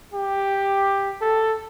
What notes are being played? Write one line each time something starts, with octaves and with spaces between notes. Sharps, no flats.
G4
A4